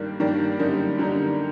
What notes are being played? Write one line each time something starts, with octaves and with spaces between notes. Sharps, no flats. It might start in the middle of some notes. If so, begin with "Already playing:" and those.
Already playing: G2 D#3 G3 A#3
G2 D#3 G3 A#3
F#2 D3 G3 A#3 D#4
F#2 D3 G3 A#3 D#4